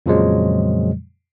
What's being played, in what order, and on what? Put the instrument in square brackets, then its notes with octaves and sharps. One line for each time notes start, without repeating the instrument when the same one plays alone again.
[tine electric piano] F2 A#2 C#3 F3 F#3 G#3